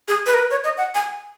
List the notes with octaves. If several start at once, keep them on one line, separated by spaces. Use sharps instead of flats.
G#4
B4
A#4
B4
C#5
D#5
F#5
G#5